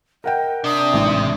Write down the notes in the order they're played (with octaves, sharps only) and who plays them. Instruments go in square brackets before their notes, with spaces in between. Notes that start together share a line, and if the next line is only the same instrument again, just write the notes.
[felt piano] A#4 F#5 G5 [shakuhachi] D#5
[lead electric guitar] C3 [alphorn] D4 [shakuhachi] D#6
[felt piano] A1 G#2